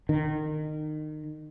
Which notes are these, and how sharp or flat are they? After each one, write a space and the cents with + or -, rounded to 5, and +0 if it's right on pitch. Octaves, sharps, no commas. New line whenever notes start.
D#3 -25